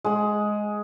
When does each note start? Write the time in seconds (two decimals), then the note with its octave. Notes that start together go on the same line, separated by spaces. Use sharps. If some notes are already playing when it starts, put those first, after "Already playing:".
0.04 G#3 F#5